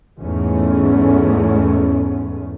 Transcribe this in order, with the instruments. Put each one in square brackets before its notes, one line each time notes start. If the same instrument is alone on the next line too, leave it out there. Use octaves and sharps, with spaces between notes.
[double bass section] E2 G#2 A3 C#4